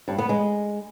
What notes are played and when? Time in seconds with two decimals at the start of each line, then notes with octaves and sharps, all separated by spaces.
0.08 G2
0.18 B3
0.29 G#3